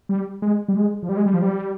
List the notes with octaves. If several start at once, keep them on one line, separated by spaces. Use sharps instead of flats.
G3
G#3
G3
G#3
F3
G3
G#3
G3
F3
G3